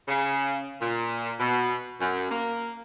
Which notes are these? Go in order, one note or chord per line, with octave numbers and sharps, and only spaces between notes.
C#3
A#2
B2
F#2
A#3